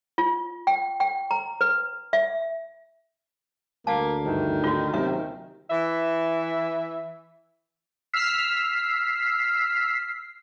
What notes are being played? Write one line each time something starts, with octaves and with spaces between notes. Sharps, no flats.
F4
G5
G5
A#5
B4
E5
D2 A#3 F5 A5
G2 D#3 E3
D#4 F4 F#4 F#5 G5
D#2 C3 F#3 C#4 E5
E3 E5
E6 F6 B6 C7